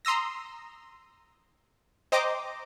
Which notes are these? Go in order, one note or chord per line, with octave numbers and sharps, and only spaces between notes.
A#5 C6 D#6 E6 A#6
C5 D#5 G5 A#5 D6